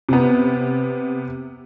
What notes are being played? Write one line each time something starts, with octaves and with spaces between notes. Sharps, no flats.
C3 B3